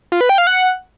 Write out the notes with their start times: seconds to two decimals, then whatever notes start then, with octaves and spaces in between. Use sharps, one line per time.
0.12 F4
0.21 B4
0.29 G5
0.38 F5
0.47 F#5